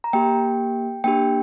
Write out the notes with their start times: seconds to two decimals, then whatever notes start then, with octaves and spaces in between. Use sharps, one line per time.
0.04 A#5
0.13 A#3 G4 G5
1.04 A#3 D4 G4 G5